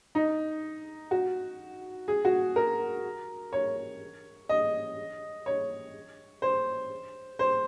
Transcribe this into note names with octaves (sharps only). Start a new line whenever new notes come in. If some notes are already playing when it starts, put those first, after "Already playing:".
D#4
F#4
G#4
F#4
A#4
C#5
D#5
C#5
C5
C5